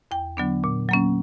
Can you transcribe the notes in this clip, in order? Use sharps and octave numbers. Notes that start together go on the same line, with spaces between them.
E2 G5
D3 F#3 B3 D4
A#2
F#3 A#3 C#4